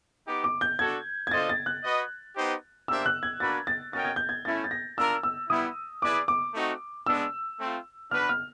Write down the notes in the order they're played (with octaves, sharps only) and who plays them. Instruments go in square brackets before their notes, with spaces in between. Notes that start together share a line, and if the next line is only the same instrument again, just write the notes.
[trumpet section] B3 D#4 G4
[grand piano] D6
G6
[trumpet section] D4 F#4 A4 [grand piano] G#6
[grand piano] G#6
[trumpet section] D4 F4 A4 C5 D#5 [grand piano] A6
[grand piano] A6
F#6
[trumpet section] F#4 B4 D#5
B3 D#4 G4 C5
[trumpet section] A#3 D4 G4 C5 E5 [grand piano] E6
[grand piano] F#6
G#6
[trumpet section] A#3 D4 F#4 B4 [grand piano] A6
[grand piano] A6
[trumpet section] C#4 F#4 A#4 D#5 G5 [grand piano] A6
[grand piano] G#6
G6
G#6
[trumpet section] A3 C#4 E4 [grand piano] A6
[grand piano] A6
A#6
[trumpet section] D4 F4 A#4 [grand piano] E6
[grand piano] E6
[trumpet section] G3 B3 E4 [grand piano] D#6
[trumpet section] E4 G#4 B4 D5 [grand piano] D6
[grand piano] D6
[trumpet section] A3 C4 D#4 F#4
[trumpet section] G#3 B3 D4 [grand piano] E6
[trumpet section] A3 C4 F4
[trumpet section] D4 F#4 B4 [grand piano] F6
[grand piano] F6